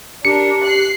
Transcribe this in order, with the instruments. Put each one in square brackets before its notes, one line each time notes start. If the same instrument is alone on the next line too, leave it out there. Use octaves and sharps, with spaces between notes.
[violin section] D4 A#4 [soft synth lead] G4 [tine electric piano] C#7
[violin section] F#6 C7